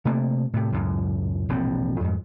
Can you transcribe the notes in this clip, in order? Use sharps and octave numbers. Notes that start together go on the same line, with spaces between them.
C3 A3 A#3
A2 C3
C#2 F#2 A2
E1 A#1 A2 C4
F2 G#2